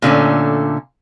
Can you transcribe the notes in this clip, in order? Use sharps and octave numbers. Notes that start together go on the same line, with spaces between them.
A#2 D3 A3 C#4